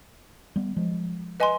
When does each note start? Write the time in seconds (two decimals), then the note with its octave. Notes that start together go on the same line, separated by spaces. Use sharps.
0.56 G3 B3
0.77 F3 G#3
1.40 B4 D#5 G#5 C6